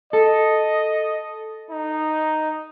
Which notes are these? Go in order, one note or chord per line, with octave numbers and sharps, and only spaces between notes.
A4 D#5
D#4